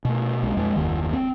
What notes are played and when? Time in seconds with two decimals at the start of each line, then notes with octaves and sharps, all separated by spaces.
0.05 B2 A3
0.43 B1 G#3
0.57 F2 G#3
0.76 F#1 D#2 D#3
1.13 C4